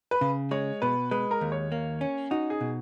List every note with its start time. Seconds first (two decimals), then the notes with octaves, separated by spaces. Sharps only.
0.11 B4
0.21 C#3
0.51 G#3 C#5
0.82 B2 B4
1.11 G#3 B4
1.31 A#4
1.41 D#2
1.52 C#5
1.72 A#3
2.01 C#4
2.31 D#4 F#4
2.50 G#4
2.61 B2